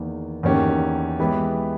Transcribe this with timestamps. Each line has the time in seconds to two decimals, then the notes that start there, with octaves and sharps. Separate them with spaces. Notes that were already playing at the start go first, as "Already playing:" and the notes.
Already playing: E2 D#3 A#3
0.43 E2 D#3 A#3 C#4 G4
1.19 E3 G#3 B3 G4 B4